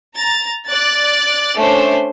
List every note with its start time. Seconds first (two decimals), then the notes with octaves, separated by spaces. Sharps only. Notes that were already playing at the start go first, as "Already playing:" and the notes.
0.16 A#5 A6
0.68 D5 F#6 A6
1.55 A3 C#4 D4 C5